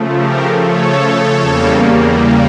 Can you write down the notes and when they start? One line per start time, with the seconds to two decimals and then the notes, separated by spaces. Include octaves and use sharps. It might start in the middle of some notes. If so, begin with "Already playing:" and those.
Already playing: C#3 F3 A3
0.15 G4 A#4
0.56 A4 C#5
1.40 E2 C#3 G3 A#3